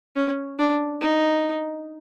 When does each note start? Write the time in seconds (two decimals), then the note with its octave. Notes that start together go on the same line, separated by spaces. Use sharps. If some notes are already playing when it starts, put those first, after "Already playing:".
0.16 C#4
0.59 D4
1.01 D#4